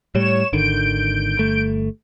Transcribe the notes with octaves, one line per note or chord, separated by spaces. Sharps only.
A2 G3 C#5 E7
G#1 D3 D#3 G6 D7
G1 A3